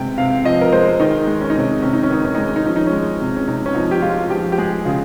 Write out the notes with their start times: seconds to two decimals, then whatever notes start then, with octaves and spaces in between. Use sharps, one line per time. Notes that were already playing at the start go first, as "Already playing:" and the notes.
Already playing: C3 G#3 G5
0.18 C3 F5
0.44 F3 D#5
0.61 A#4
0.72 G#3 C5
1.00 D#3 D#4
1.27 G#3
1.41 C#4
1.50 D#4
1.55 C3 C#4
1.82 C3 C#4
1.93 D#4
2.03 C#4
2.10 D#3 D#4
2.25 C#4
2.35 G#3 D#4
2.46 C#4
2.56 D#4
2.65 F3 C#4
2.76 D#4
2.87 C#4
2.92 G#3
3.20 C3
3.36 C#4
3.48 C3 D#4
3.66 C#4
3.74 F3 D#4
3.91 G4
4.02 G#3 F4
4.30 F3 G4
4.52 G4
4.58 G#3 G#4
4.85 C#3 F4